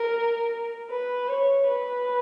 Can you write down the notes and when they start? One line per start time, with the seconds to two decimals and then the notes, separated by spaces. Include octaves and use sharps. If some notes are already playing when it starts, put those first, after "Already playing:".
Already playing: A#4
0.90 B4
1.29 C#5
1.68 B4